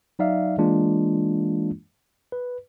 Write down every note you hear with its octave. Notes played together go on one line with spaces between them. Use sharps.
F#3 D#4 D5 E5 F5
E3 G#3 A#3 D4 F4
B4